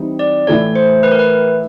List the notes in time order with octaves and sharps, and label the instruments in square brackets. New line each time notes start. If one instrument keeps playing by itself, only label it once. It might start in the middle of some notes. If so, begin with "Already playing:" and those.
Already playing: [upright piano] E3 G3 C4 D#4
[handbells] D5
[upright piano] A2 E3 A3 [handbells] C#5
[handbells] C5
B4
A#4
B4